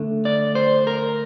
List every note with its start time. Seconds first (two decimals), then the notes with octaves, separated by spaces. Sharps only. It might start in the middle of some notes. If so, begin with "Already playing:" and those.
Already playing: D3 A3
0.25 D5
0.55 C5
0.87 A#4